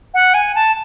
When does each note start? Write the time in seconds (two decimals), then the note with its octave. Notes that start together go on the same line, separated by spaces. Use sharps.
0.14 F#5
0.34 G#5
0.55 A5